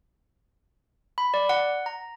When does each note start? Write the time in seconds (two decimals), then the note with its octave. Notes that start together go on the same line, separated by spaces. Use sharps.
1.18 B5
1.34 D5
1.49 F#5
1.86 A#5